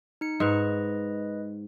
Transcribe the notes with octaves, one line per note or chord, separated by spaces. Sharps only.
D#4 C#7
G#2 B4 D#5